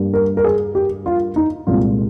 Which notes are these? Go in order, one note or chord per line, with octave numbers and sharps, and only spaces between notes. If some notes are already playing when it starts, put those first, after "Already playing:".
Already playing: G2 G3 A#3
A#4
A#4
G#4
G4
F4
D#4
C2 A#2 G#3 C4 F4